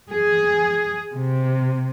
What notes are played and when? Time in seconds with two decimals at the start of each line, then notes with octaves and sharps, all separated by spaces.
0.11 G#4
1.15 C3